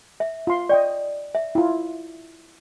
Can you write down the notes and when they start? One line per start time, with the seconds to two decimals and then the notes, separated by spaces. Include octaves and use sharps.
0.20 E5
0.47 F4 C6
0.69 D5 D#5 G5 C#6
1.35 E5
1.55 E4 F4